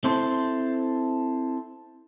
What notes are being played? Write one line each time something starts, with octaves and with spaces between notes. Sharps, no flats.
C4 E4 A4 C5